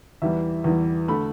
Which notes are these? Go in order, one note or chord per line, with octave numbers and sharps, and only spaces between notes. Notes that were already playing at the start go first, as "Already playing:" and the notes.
E2 E3 G3 E5
E2 E3 G3
D3 A3 B5